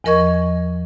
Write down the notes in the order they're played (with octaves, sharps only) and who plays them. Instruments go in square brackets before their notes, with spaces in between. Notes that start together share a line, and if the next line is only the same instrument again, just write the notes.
[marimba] E2 F3 A#4 D#5 C#6 G#6